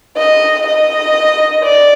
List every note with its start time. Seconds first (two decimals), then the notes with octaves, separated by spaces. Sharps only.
0.17 D#5
0.66 D#5
1.64 D5